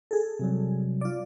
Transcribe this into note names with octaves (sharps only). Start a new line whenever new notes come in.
G#4 A4
C3 F#3 G3
F4 D5